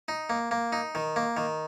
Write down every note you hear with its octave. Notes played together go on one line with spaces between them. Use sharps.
D#4
A#3
A#3
D#4
D#3
A#3
D#3